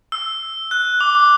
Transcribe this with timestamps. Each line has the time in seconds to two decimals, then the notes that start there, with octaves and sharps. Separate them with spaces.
0.12 E6
0.71 F#6
1.01 D6
1.15 D6